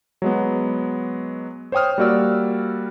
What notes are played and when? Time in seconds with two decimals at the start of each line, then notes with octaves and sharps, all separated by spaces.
0.22 F#3 G#3 B3
1.72 C5 C#5 G5 D#6 F6
1.98 G3 A#3 F#4 D5 E6